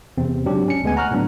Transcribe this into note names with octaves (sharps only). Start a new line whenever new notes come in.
E2 C3 C4
G#2 C#3 F#3 D4 G4
C#4 C#7
D2 G#3 B3 G#5
F#5 A#5 C#6 F6 F#6
A2 D3 F#3 B3 D4